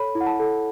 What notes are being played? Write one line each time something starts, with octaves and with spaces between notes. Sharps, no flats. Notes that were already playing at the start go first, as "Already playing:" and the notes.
Already playing: A4 C#5 B5
E4
F#5
A5
A4